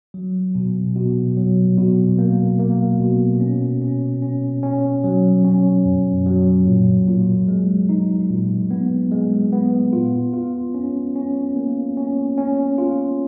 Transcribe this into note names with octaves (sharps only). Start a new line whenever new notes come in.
F#3
B2
B2
F#3
B2
A#3
A#3
B2
C#4
C#4
C#4
C#4
F#3
C#4
F#2
F#3
A#2
A#2
G#3
D#4
A#2
B3
G#3
B3
F4
F4
C#4
C#4
A#3
C#4
C#4
F4